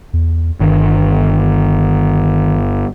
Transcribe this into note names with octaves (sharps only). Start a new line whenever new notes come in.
E2
G1 D#3